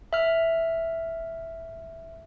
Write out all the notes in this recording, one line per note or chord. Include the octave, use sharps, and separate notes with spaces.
E5 F6